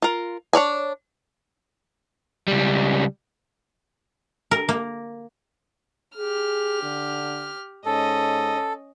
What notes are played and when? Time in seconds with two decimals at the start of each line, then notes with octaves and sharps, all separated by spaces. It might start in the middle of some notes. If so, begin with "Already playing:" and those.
0.02 F4 A#4
0.53 D4 C#5 D5 G#5
2.48 C#2 G3
4.51 A#4
4.69 A#3
6.17 G4 G#4 F6
6.83 D3
7.86 G#2 C#4 A4 D#5